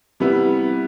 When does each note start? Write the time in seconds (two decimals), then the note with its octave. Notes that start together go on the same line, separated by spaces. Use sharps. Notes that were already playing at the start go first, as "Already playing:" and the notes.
0.20 C3 G3 B3 E4